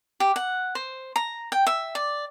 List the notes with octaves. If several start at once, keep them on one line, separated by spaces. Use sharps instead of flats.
G4
F#5
C5
A#5
G5
E5
D5